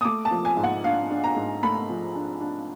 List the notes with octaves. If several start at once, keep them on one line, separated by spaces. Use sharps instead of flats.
D#6
A3 D6
A5
F3
G#5
G#2
F#5
D4 F5
D4
A#5
G#2
A3 B5
F3
D4
D4